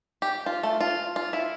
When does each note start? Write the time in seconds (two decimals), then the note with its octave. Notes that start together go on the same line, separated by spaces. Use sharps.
0.22 G4
0.46 F4
0.63 A3
0.80 F4
1.16 F4
1.33 E4